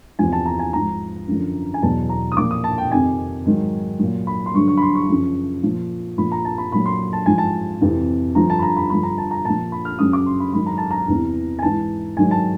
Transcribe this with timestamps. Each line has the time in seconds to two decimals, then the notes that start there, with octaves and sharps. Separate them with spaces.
0.19 E2 C3 F3 G#5
0.32 A5
0.46 A#5
0.59 G#5
0.73 G#2 F3 A#5
1.28 F#2 D3 F3
1.74 G#5
1.82 E2 B2 F#3 A5
2.09 A#5
2.32 D#6
2.37 A#2 F3 D6
2.51 D#6
2.64 A5
2.78 G5
2.91 F2 C3 D#3 G#5
3.46 G#2 D#3 F#3
3.99 A#2 F#3
4.27 B5
4.46 C6
4.54 G2 D3 F#3 C#6
4.68 C#6
4.77 B5
4.82 C6
4.95 C#6
5.09 F#2 C#3 F3
5.63 A#2 F3
6.17 A#2 F3 B5
6.32 A#5
6.45 A5
6.58 B5
6.72 A#2 F#3 B5
6.86 C6
7.13 A5
7.26 G#2 F3 G#5
7.38 A5
7.81 F2 C3 E3
8.35 G2 D3 F3 A#5
8.50 A5
8.59 B5
8.62 A#5
8.77 B5
8.90 G2 D3 F3 B5
9.03 A#5
9.18 A5
9.31 A#5
9.45 A#2 F3 A5
9.72 B5
9.85 F6
9.99 F#2 C#3 F#3 D#6
10.13 D6
10.26 C6
10.40 B5
10.54 G#2 D#3 F#3 B5
10.66 A#5
10.78 A5
10.91 A#5
11.08 E2 C3 E3
11.59 G#5
11.62 G#2 E3 A5
12.17 G#2 D#3 F#3 G#5
12.31 A5